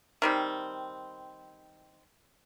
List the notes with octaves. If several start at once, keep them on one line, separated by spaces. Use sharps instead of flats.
D#3 G3 C4